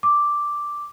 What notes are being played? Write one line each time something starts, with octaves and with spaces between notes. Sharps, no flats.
D6